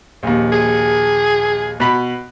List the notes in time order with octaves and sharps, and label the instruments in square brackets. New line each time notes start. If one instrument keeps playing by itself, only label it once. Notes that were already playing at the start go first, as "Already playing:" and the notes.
[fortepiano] A#1 D#2
[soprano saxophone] G#4
[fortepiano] B2 B5